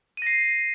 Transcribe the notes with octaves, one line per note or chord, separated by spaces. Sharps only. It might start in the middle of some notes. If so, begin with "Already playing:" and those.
A#6 C7 D#7